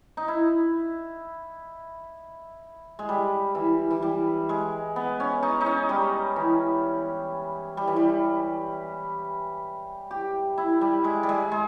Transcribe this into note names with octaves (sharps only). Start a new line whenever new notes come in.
D#4
E4
G#3
G3
E3
E3
G3
G#3
B3
C#4
D#4
D#4
C#4
G3
E3
G3
E3
G3
G4
E4
G3
G#3
G3
G#3
G#3